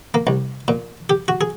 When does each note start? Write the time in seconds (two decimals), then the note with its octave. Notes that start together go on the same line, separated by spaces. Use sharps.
0.14 A#3
0.27 C2
0.68 A#2
1.10 G4
1.28 F#4
1.41 G#4